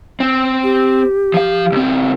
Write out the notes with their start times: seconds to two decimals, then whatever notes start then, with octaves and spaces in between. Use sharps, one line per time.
0.20 C4
0.63 G4
1.34 F3 F5
1.72 C#2 C4